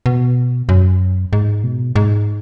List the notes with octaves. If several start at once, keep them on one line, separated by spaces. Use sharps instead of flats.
B2
F#2
G#2
B2
G#2